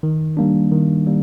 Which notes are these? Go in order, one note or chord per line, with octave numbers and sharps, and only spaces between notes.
D#3
G3 A#3 D4
D#3
G3 A#3